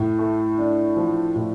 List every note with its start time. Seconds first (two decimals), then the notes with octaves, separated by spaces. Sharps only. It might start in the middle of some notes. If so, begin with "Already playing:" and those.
Already playing: A2
0.18 A3
0.58 D4
0.97 F3
1.36 A2